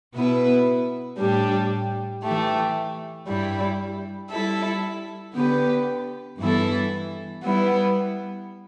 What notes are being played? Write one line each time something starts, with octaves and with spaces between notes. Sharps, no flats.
B2 B3 E4 B4
A2 G3 D4 G4
E3 A3 G4
G2 G3 E4
G3 E4 A4 E5
D3 B3 G4 B4
G2 E3 B3 E4 A4
G3 B3 E4